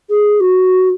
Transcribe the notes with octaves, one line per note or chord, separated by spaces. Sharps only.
G#4
F#4